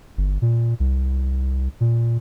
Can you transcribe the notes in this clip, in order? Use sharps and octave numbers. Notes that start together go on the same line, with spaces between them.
G1
A#2
C2
A#2